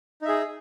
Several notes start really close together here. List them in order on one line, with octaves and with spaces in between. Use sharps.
D#4 E5 G#4